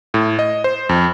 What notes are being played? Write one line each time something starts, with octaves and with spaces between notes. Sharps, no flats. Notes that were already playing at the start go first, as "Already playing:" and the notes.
A2
D#5
C5
F2